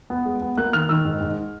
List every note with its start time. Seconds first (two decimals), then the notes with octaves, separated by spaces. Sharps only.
0.10 B3
0.25 G#3
0.42 B3
0.58 A#3 F#6
0.73 D#3 F6
0.89 D#3 E6
1.05 G#2
1.21 G#2